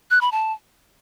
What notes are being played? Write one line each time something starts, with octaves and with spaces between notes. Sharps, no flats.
F#6
B5
A5